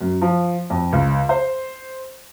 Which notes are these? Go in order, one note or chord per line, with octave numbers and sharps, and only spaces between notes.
F#2
F3
F2
C#2
C5